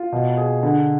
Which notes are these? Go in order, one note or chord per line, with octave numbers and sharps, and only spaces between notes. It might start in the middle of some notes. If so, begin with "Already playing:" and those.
Already playing: F4
B2
G#4
D3